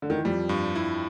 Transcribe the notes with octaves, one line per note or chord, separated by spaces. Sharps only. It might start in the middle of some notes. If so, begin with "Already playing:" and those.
D3
D#3
E3
F2 F3 G3
G2
E4